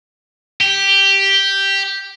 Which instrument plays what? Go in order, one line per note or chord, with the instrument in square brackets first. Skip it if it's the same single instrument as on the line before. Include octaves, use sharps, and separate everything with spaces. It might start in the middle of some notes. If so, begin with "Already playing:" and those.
[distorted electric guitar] G4